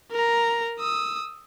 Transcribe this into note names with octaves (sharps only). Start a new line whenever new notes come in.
A#4 A#5
D#6 E6